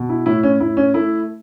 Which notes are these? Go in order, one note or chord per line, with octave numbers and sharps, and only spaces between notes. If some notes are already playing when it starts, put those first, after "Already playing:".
Already playing: B2
E4
A2 E4
C#4
A2 E4
C#4
A3 E4